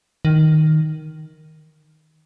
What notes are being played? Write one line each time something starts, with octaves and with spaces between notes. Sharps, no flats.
D#3